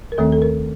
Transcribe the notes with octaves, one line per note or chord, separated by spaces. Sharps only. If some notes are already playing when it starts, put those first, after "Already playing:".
A#4
D#2 D#3 A3 C4 A4
A4
A#4